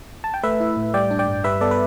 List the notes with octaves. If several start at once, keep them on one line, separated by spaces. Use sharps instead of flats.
A5
G5
A3 B4 E5
E4
A2
G3 D5 G5
D4
D5 G5
G2
G3 B4 E5
B3 A4 D5
B4